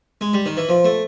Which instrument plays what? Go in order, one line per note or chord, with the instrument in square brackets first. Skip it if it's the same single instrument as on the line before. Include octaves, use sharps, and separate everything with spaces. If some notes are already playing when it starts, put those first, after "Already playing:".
[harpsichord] G#3
G3
D#3
E3
F3
A3